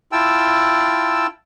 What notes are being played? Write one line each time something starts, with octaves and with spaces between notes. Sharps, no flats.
E4 F4 G5 A5 E6